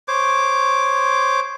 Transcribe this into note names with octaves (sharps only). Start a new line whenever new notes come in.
C5 C#5 D6